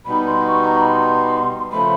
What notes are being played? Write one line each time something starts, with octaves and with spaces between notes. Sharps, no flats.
B2 G3 B3 D#4 B5
C6
C#6
A#5
B5
C6
C#3 F3 A3 B5